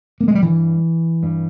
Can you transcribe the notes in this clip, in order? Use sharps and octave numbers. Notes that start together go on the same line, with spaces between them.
A#3
G#3
G3
G2 E3
G2